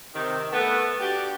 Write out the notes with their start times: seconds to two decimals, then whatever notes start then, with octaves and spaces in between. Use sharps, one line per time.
0.15 C3 D#3
0.52 A3 B3
0.99 D4 F#4 G4